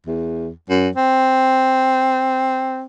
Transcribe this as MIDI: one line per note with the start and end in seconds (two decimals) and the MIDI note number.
0.06 0.50 40
0.69 0.88 42
0.96 2.84 60